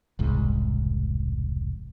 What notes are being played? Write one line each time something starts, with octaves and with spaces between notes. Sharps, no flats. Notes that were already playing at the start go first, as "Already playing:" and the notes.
E1 C2 G#2